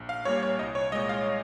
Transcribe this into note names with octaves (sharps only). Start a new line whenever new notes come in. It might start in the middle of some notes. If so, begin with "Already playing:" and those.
Already playing: A#1
F5
A#2 G3 A#3 C#5
C#5
C2 D#5
C#5
A#2 G#3 D#5
F5